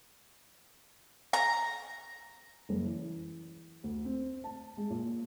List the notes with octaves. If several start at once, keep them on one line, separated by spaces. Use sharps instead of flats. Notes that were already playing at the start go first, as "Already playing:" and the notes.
A#5
F#1
E3
D2
C4
A5
G#3
A#2